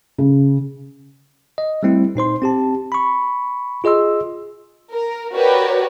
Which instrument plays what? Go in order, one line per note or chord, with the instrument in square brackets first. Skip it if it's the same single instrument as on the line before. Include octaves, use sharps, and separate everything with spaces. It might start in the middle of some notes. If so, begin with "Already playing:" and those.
[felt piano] C#3
[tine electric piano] D#5
G3 A3 C4 E4
A#2 D#4 C5 C6
C4 G4 A5
B5 C#6
F4 G#4 D#5 C6 E6
[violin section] A#4
F#4 G4 A#4 B4 C#5 D5